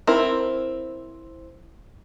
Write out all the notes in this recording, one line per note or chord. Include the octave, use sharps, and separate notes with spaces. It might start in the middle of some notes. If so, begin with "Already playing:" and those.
C4 E4 A#4